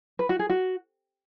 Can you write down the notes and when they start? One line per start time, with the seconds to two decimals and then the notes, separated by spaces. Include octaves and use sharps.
0.19 B4
0.29 F#4
0.39 G#4
0.50 F#4